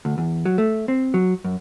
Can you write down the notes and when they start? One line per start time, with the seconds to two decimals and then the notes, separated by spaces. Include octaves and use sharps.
0.05 D2
0.18 E2
0.45 F#3
0.58 A3
0.88 C4
1.14 F#3
1.45 F#2